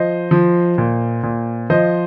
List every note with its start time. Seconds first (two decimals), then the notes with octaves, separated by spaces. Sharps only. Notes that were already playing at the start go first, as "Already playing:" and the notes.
Already playing: F3 C5 D#5
0.31 F3
0.78 A#2
1.23 A#2
1.70 F3 C5 D#5